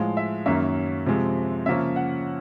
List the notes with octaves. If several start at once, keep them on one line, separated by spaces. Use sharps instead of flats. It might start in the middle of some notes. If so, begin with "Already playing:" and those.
Already playing: A2 F3 G#3 F5
E5
F#2 D#3 F#3 A#3 C#4 E5
C3 F3 G#3 C4
C#3 F3 A#3 C#4 E5
F#5